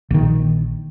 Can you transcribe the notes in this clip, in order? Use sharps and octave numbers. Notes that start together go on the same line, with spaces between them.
A#1 D#3